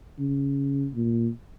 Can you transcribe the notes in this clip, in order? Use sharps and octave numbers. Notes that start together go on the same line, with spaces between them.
C#3
A#2